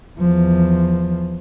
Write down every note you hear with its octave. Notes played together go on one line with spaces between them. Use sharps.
E2 F3